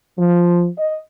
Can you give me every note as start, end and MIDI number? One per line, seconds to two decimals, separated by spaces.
0.18 0.67 53
0.77 0.98 75